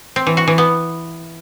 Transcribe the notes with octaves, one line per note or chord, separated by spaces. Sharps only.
C4
E3
F#4
E3
B3